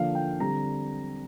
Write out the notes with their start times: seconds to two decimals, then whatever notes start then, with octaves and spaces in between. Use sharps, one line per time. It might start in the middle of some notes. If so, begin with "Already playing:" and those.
Already playing: D3 F3 A#3 D4 F5
0.15 G5
0.40 D3 G3 C4 A#5